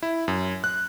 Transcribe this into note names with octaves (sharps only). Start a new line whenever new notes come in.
E4
F#2
F#6